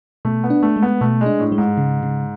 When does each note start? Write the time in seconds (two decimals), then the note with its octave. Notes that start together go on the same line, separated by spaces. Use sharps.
0.25 B2 A3
0.44 B3
0.50 D4
0.63 A3
0.76 G#3
0.82 B3
1.01 B2 A3
1.21 G#3
1.26 D4
1.40 A2
1.52 G#3
1.58 G#2
1.78 C#3
2.03 C#3